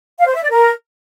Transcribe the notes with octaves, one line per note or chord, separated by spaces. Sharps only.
F5
C5
E5
D5
A#4